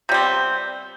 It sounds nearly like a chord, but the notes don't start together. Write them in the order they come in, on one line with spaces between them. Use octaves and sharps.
C3 G3 C4 B3